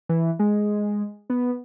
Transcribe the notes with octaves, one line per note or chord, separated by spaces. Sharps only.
E3
G#3
B3